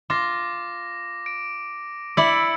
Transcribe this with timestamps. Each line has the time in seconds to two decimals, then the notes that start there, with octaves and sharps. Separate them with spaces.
0.10 F4 D6 A#6
1.26 D7
2.17 E4 D5 E6 C#7 D7